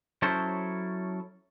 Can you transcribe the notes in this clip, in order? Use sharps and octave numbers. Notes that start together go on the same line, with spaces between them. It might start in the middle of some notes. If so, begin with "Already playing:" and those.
F#3 C#4 E4 A4 C5